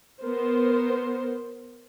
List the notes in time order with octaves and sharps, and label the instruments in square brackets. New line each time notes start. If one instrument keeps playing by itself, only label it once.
[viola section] B3 A#4 C5